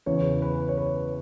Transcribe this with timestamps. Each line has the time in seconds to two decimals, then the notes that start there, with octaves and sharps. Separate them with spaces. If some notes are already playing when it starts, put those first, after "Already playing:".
0.06 E2 C#3 E3 C#5
0.42 B4
0.69 C#5
0.78 B4